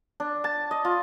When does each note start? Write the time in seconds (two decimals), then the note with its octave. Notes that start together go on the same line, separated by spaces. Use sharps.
0.20 D4
0.44 A5
0.71 D#5
0.85 F4